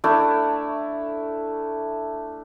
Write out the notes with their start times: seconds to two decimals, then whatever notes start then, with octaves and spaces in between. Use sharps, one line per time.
0.04 A3 D4 E4